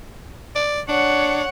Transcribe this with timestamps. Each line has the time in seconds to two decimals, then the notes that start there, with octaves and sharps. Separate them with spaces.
0.55 D5
0.88 D4 C#5 F#5